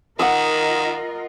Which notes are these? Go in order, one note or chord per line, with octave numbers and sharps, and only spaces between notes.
D#3 F4 A#4 D#5 F#5 D#6 E6